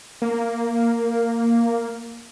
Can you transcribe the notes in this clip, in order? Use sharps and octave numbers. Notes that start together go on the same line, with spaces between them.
A#3